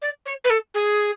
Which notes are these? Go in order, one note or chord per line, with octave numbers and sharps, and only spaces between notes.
D5
C#5
B4
A4
G#4